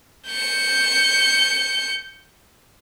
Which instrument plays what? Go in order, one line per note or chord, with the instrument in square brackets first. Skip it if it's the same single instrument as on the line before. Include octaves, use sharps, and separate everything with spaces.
[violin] G6 C#7